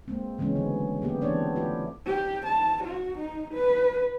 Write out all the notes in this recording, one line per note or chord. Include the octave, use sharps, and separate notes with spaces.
G#3 A#3 C4
C#3 E3 G#3 B3 C#4
D3 F#3 A3
A#3 B3 G4 G#4
E3 B3 C4 D4 C#5 D5
A3 E4 F4 G4
G4
A5
F#4
D#4
B4